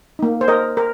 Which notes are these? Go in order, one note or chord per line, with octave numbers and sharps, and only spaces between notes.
A#3 D#4
C5
A#4 D#5
A#4